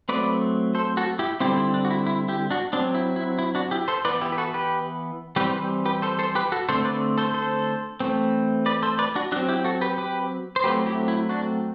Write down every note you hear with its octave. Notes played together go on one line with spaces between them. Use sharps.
F#3 A3 C4 B4 D5
A4 C5
F#4 A4
E4 G4
D3 G3 C4 E4 G4
E4
D4
F#4
E4
E4
E4 G4
D4 F#4
F#3 C4 D4
E4
E4
E4
D4 F#4
E4 G4
A4 C5
E3 B3 B4 D5
E4 G4
B4
F#4 A4
G4 B4
E3 G3 C4 G4 B4
G4 B4
G4 B4
A4 C5
A4 C5
G4 B4
F#4 A4
D3 A3 C4 A4 C5
B4 D5
A4 C5
A4 C5
E3 A3 C4
B4 D5
A4 C5
B4 D5
D4 F#4
F#3 C4 D4 F#4
E4 G4
F#4 A4
G4 B4
G4 B4
C5
F#3 A3 C4 G4 B4
E4 G4
E4
D4 F#4